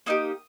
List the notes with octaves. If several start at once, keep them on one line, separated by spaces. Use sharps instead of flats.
A#3 D#4 G4 D#6